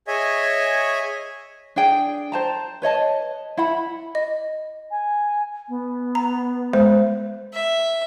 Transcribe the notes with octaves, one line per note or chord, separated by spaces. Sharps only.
G#4 C#5 D#5 E5 G#5
D4 G#4 G5
C5 A5 A#5
B4 C#5 D#5 A5
E4 F#5 B5
D#5
G#5
B3
A#5
G#3 C5
E5